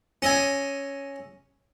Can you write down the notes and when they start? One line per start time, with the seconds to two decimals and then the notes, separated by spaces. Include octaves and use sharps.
0.22 C#4 D#5 E5 G#5